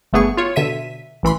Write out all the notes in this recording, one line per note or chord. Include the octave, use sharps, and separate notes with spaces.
G1 A3 B3 G#4 C#6
F4 C#5
B2 D3 E5 B6 D#7
A1 E3 B5 C6